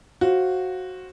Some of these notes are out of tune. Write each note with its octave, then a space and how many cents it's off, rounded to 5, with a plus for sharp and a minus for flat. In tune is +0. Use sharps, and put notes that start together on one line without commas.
F#4 +0 C5 +20 F5 +0